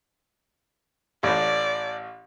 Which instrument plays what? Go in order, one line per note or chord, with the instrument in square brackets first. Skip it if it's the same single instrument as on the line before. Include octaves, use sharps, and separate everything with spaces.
[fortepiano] A1 A2 [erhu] D5